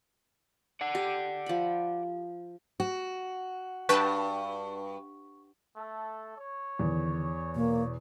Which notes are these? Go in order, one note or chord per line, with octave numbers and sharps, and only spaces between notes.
D5 F#5
G4
F3 B5
F#4
G2 B4 G5 A5 C#6
A3 A4
C#5
E2 D3 D#3
B2 A#3